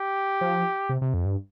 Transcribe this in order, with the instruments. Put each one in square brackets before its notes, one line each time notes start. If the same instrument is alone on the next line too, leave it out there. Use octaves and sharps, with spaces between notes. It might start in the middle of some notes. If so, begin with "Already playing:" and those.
Already playing: [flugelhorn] G4
[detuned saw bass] F3
C3
C3
F2
G2